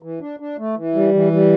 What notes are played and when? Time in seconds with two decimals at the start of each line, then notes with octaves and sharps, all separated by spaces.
0.02 E3
0.21 D4
0.40 D4
0.58 A3
0.76 E3
0.95 G3
1.14 E3
1.32 G3